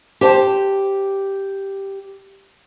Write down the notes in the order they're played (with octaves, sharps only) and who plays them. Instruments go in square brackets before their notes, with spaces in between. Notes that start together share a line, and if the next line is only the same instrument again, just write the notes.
[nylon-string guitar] G4 C5 A5